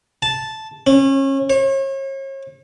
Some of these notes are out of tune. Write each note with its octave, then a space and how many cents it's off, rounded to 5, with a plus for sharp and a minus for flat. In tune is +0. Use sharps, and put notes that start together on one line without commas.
A5 -5
C#4 -30
C#5 -40